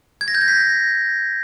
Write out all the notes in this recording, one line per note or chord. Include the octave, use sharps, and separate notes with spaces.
G#6
A#6
G6
A#6
B6